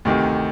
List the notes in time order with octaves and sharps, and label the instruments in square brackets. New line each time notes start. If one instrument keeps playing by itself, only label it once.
[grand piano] D2 C3 D#3